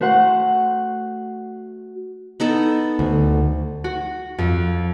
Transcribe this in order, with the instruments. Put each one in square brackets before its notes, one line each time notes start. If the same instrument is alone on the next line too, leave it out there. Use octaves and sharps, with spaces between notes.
[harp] A3 F#4 C5 F#5
[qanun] B3 D#4 A4
[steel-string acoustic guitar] D2
[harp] F#4
F2